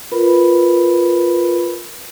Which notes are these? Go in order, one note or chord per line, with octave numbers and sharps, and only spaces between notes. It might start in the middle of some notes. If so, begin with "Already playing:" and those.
F4 A#4 B4 B5